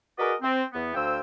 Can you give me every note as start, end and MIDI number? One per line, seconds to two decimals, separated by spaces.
0.17 0.33 66
0.17 0.33 68
0.17 0.33 70
0.17 0.33 71
0.17 0.33 74
0.17 0.33 75
0.41 0.63 60
0.72 0.90 40
0.72 0.90 59
0.94 1.20 38
0.94 1.20 72
0.94 1.20 77
0.94 1.20 79
0.94 1.20 88